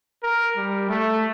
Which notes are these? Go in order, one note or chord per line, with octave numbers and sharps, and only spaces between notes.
A#4
G3
A3